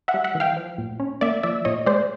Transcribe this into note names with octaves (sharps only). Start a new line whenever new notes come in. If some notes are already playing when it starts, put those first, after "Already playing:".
E5 F#5
G3
E5 F#5
E3
F5 G5
F3
A#2
C#4
A#3 D5 E5
F3 D5 E5
A#2 C#5 D#5
G#3 C5 D5